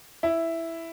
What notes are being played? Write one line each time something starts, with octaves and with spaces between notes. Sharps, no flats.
E4